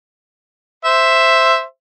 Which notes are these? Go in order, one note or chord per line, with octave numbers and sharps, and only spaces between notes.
C5 E5